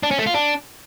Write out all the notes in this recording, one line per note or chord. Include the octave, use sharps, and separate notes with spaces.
D4
C#4
A3
F4
D4